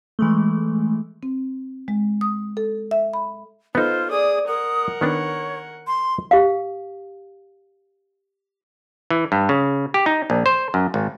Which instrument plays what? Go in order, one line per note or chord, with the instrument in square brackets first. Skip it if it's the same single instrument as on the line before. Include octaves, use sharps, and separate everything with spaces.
[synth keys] E3 G#3 A3
[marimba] C4
G#3
D#6
A4
E5
B5
[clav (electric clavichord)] B3 D#4 [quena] F4 [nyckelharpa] A4 C5
[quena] G#4 [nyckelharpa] D5 D#6
[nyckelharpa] A#4 F#5 [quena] D#6
[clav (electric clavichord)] D#3 B3 D4 [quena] C#5
[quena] C6
[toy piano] G4 F5
[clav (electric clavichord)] E3
G2
C#3
G4
D#4
A#1
C5
F#2
G#1